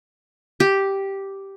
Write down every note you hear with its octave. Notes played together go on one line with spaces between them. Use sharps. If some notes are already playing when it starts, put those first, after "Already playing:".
G4